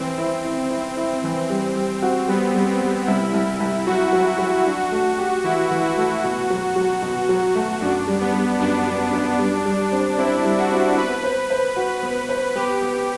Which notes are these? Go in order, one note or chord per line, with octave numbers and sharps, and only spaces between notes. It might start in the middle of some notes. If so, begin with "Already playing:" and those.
Already playing: E3 C4
E4
E4
E4
E4
E3
G3
G3
F#4
G3 B3
G3
C4
G3
C2 E4
C2
C2
F#3 F#4
F#3
F#3
D4
A3
G4
E3 E4
E3
F#4
A3
B2
F#3
F#3
B2
F#3
A3
F#2 D4
G3
B3
G3
F#2 D4
F#2
F#2
G3
G3
C4
C4 E4
G3
F#4
C4
B3 B4
C5
C5
F#4
B3
C5
B3 G4
B3